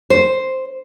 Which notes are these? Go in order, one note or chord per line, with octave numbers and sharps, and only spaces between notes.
C5